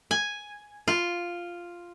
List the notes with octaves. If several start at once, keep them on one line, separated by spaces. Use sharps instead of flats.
G#5
F4